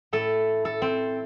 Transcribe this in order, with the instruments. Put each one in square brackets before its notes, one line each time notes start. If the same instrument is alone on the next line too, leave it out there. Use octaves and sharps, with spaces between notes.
[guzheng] A2 A3 A4
A4
C4